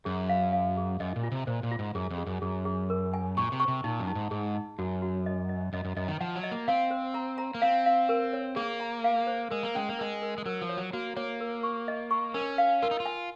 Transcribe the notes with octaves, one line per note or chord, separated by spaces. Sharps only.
F#2 G#4
F5
F5
G#4
F#2 D#5
A#2
F4
C3
A#2 C5
A#2
F4
G#2
F#2 G#4
F2
G#4
F#2
F#2 G#4
G#4
A#4
G#5
A#2 C#6
C3
C#6
C3
A#2 D#4
F#2
D#4
G#2
G#2 G#4
D#4
F#2 F#4
F#4
D#5
D#5
F#2 D#5
F#2
F#2 D#5
D#3
F3 F#5
F#3
D#5
A#3
C4 F5
C5
A#5
A#5
A#3
C4 F5
F5
A#4
C#5
A#3 G#4
A#5
F5
C5
G#3 A#4
A#3
G#3 C#4
A#3
G#3 A#4
A#4
G#3
F#3 A#4
F3
C#5
F#3
A#3 F#4
A#3 C#5
A#4
C#6
D#5
C#6
C#4 A#4
F5
F4 A#4
D#4
F4
G#5